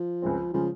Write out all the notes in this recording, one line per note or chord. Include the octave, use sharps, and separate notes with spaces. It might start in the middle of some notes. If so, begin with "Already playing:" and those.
Already playing: F3
C#2 C#3 G#3 C4
C#3 F3 G#3